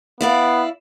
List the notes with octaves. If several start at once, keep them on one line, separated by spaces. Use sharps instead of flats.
B3 E4 D5 F5